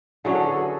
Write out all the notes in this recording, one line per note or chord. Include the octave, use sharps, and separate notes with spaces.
D3 F#3 C#4 E4 G#4
F#4 A4
G#4 B4
F#4 A4